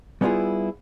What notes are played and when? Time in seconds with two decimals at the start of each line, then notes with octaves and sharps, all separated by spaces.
0.21 G3 B3 C#4 E4 F4 G#4